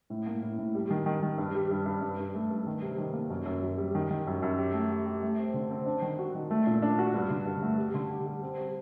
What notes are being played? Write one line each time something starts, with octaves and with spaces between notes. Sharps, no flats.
A2
A#3
A2
A2
G3
D#3
D#3
D#3
G2
G3
G2
G2
G2
G2
A3
G2
D#3
C3
D#3
A#3
F#2
F#2
F#2
G3
D#3
D#3
F#2
F#2
G4
A3
G4
G4
A3
C4
D3
C4
D4
D#3
F#4
D#3
A3
A#2
D4
F#4
G2
D3
G2
A3
G3
D3
G4
G3
C4
G3